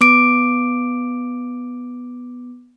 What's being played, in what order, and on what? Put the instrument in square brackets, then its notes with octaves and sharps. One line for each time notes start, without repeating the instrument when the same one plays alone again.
[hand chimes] B3 D6 D7